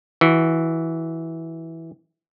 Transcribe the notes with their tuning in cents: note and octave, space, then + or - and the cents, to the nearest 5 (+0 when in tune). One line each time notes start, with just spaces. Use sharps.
E3 -10 F#4 +0